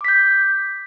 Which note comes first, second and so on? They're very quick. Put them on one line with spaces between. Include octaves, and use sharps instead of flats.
D6 B6 G6